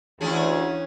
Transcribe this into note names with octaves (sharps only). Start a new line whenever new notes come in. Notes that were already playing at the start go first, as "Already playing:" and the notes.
D2 E3 C#4 G#4